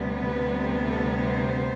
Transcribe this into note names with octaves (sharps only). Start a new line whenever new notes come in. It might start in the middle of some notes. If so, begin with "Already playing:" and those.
Already playing: D2 C3 G3 B3
B4
A4
C5